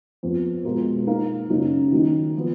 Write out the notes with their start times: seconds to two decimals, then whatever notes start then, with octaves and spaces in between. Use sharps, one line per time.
0.23 F2 F3 B3
0.65 B2 G#3 B3 F4 A#4
1.07 A#3 D#4 A#4 F5
1.49 F#2 C#3 F#3 A#3 D#4
1.91 D#3 F#3 A#3 D#4
2.37 F3 B3